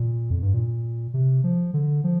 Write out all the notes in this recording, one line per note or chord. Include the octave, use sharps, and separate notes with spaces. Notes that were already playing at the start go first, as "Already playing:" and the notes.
Already playing: A#2
F2
G2
A#2
C3
F3
D3
F3